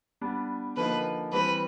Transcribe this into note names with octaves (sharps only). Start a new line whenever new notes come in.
G3 B3 D4
D3 F3 A#3 D#4 B4
E3 G3 C4 B4